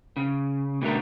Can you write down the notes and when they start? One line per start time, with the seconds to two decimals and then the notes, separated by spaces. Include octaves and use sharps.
0.17 C#3
0.82 B2 D3 A3 A#4